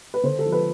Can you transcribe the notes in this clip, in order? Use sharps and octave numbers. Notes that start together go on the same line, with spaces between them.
B4
D3 C5
A4
F3
B4